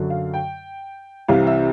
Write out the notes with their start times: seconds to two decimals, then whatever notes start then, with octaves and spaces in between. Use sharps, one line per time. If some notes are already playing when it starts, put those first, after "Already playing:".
Already playing: F#2 D3 F#3
0.10 F5
0.34 G5
1.28 C2 C3 E3 F5
1.47 E5